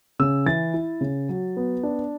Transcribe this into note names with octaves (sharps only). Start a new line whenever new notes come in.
C#3 E6
E3 A6
E4
C#3
F#3
B3
D4